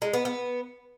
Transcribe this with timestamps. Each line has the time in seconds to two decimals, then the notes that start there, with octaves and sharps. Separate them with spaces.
0.02 G#3
0.13 B3
0.25 B3